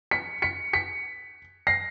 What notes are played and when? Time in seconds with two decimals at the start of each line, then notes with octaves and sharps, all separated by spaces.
0.11 B6 C#7
0.42 B6 C#7
0.73 B6 C#7
1.67 A#6 C7